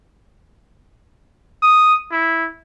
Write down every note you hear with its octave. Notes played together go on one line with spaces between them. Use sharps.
D#6
E4